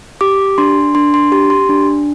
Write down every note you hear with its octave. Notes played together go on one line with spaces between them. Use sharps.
G4 D6
D4 C6
D4 C6
C6
G4 C6
C6
D4